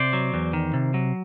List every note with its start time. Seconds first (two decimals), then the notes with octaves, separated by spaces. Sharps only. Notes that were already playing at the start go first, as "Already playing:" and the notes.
Already playing: C3 C5 D5
0.13 F#3
0.34 E2
0.53 D#3
0.73 C3
0.94 F#3